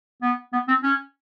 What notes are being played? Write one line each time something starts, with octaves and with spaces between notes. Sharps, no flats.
B3
B3
C4
C#4